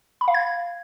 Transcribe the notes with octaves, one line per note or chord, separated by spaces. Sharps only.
B5
F5
G#6